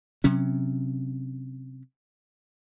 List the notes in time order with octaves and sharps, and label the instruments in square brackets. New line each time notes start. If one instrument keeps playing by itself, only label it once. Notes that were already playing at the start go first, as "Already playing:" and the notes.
[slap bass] C3 F#3 C#4